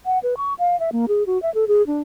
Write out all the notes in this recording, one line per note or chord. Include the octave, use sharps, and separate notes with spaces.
F#5
B4
C#6
F5
E5
A#3
G#4
F#4
E5
A4
G#4
D4